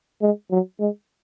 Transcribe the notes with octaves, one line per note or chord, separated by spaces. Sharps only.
G#3
F#3
G#3